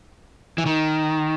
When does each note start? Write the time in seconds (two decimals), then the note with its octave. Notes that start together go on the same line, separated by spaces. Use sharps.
0.58 E3
0.66 D#3